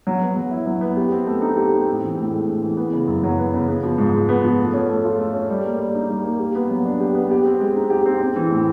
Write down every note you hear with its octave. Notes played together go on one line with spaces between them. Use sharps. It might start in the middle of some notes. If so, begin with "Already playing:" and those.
F#3
B3
F#3
E4
F#3
B3
G4
C4
A3
D#4
G4
C4
A2
E3
A2
G#3
A2
E3
B3
C#3
F#2
F#3
B3
C#3
B3
F3
G#2
G#3
B3
F3
A3
C#4
A3
F4
A3
C#4
G3
A#3
G3
D#4
G3
A#3
G4
B3
F#3
D4
G4
B3
G4
C4
G#3
D#4
G4
C4
C4
E3
A2